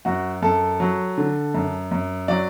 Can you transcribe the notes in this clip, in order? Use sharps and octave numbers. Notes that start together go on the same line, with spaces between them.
F#2 F#4
F#2 A4
F#3
D3
F#2
F#2
F#3 D5